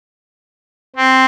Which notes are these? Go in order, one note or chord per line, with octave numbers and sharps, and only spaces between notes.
C4